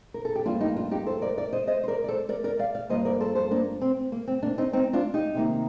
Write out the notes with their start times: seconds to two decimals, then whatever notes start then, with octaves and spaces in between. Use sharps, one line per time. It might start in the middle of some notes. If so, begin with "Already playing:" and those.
0.14 A#4
0.25 A4
0.35 G4
0.46 G2 F3 A#3 D4 F4
0.61 D#4 G4
0.76 D4 F4
0.91 D#4 G4
1.06 A4 C5
1.22 A#4 D5
1.37 A#4 D5
1.53 C5 D#5
1.67 C5 D#5
1.84 C5
1.88 A#4 D5
2.04 D5
2.08 A4 C5
2.29 A#4 D5
2.44 A#4 D5
2.59 D5 F5
2.75 D5 F5
2.89 G2 F3 A#3 C5 D#5
3.05 A#4 D5
3.20 A4 C5
3.35 A4 C5
3.51 A#3 D4
3.81 C4
4.12 A#3
4.27 C4
4.42 A#3 D4
4.58 C4 D#4
4.73 C4 D#4
4.93 D4 F4
5.14 D#4 G4
5.34 C3 D#3 A#3